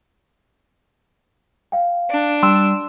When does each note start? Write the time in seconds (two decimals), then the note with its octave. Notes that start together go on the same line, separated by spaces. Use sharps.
1.72 F5 G5
2.10 D4
2.43 G3 G5 C6 E6 E7